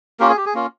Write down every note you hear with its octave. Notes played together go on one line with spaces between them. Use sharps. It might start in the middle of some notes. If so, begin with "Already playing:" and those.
A#3 C#4 F4 G4 A#4
G#4
G4
G#4
A#3 C#4 F4